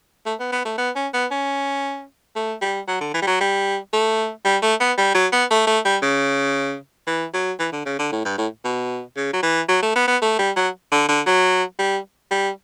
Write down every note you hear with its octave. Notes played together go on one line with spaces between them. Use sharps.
A3
B3
B3
A3
B3
C#4
B3
C#4
A3
G3
F#3
D3
E3
G3
F#3
G3
A3
G3
A3
B3
G3
F#3
B3
A3
A3
G3
C#3
E3
F#3
E3
D3
C#3
D3
A2
G2
A2
B2
C#3
F#3
E3
F#3
A3
B3
B3
A3
G3
F#3
D3
D3
F#3
G3
G3